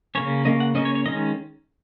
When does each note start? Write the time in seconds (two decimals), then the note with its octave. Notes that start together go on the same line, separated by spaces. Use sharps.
0.15 C#3 A#3 C#4 C#5
0.45 C#3 A#3 C#4 D#5
0.60 F#5
0.75 C#3 A#3 C#4 D#5
0.85 C#5
0.95 C#5
1.06 D#3 G#3 C#4 D#5